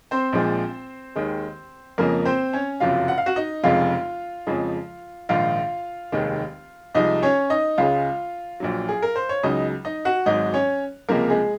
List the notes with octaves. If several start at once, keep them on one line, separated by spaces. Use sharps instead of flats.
C4 C5
A#1 A#2 F3 G#3
D#2 D#3 G#3
F2 C#3 F3 G#3 A#3 A#4
C4 C5
C#4 C#5
F#1 F2 C3 F#3 F4 F5
F#5
F5
F#4 F#5
D#4 D#5
F1 F2 C#3 G#3 F4 F5
F2 C#3 F3 G#3
A#1 G#2 D#3 F4 F5
F1 D#2 D#3 G#3
C2 C3 F3 G#3 D#4 D#5
C#4 C#5
D#4 D#5
C#2 C#3 G#3 F4 F5
A#1 A#2 F#3
G#4
A#4
C5
C#5
C#2 C#3 F#3 D#4 D#5
D#4 D#5
F#4 F#5
G#1 G#2 F#3 D#4 D#5
C#4 C#5
C#2 C3 F3 G#3 A#3 A#4
G#3 G#4